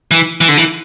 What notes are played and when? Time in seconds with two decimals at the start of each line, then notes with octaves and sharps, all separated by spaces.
0.11 E3
0.41 E3
0.49 D3
0.57 E3